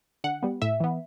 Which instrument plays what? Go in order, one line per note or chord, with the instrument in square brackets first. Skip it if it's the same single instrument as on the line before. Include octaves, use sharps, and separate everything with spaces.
[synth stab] D3 F#5
G3 B3
A2 E5
E3 B3